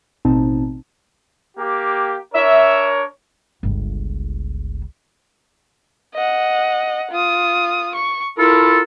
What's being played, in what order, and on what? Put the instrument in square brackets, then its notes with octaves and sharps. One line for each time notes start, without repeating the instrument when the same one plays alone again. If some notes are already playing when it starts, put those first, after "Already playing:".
[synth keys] A1 B2 C4 D#4 A5
[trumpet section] A#3 G4
[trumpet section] D4 A#4 C#5 [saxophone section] E5
[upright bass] G1 C#2
[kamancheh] D#5 F#5
F4 D#6
C#6
[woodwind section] E4 F4 A4 [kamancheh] A#4